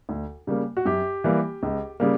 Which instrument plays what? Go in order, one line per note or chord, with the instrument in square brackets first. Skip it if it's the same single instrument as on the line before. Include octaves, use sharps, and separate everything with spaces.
[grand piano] D2
C#3 G3 A#3
F#4
F#2 G4
E3 G3 A#3
C#2
C#3 G3 A#3